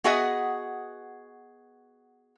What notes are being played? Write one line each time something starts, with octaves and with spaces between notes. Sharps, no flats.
B3 F#4 G#4 D#5 E5 F#5